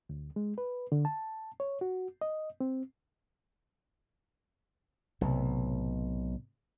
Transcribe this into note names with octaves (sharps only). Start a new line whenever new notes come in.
D2
G#3
B4
D3
A5
C#5
F#4
D#5
C4
B1 A2 C3